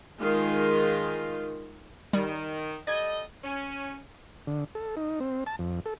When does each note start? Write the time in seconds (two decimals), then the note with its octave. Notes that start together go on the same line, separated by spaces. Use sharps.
0.21 D#3 G#3 F4
2.13 D#3 G3
2.87 G3 A4 D#5 G#6
3.44 C#4
4.47 D3
4.75 A4
4.97 D#4
5.20 C4
5.46 A5
5.59 F2
5.86 A4